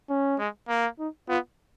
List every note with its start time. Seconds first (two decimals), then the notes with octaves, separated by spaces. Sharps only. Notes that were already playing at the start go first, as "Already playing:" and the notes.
0.10 C#4
0.39 G#3
0.69 A#3
0.99 D#4
1.29 B3 F4